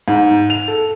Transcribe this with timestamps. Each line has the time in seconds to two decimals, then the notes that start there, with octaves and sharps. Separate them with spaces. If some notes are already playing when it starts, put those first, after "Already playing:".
0.08 G#2
0.50 F7
0.68 A4